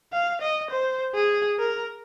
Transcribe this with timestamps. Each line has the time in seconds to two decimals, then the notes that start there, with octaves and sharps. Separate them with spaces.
0.13 F5
0.41 D#5
0.71 C5
1.14 G#4
1.59 A#4